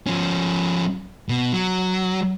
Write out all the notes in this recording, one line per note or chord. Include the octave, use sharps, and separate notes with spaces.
F3 C#4
B2
F#3